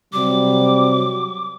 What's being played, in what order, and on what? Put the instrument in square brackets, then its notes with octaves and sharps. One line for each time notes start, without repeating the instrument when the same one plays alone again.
[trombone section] C3 F#3 G3 [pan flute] D6